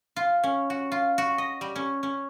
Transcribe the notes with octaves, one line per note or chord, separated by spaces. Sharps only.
F4
C#4
F#4
F4
F#4
D#5
G3
C#4
C#4